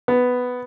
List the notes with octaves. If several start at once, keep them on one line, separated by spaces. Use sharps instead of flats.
B3